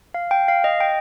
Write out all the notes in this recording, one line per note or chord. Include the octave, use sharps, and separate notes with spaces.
F5
G5
F5
D#5
G5